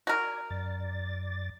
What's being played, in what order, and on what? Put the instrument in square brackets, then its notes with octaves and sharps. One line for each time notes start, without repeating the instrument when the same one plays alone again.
[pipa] F#4 A#4 [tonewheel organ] D5 G#5
[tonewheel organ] F#2 D5 A6